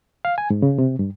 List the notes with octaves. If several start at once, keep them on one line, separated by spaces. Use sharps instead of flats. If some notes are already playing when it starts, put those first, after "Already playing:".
F5
G#5
G#2
C#3
C3
G2